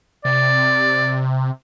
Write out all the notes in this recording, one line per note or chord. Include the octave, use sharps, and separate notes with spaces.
C3 D5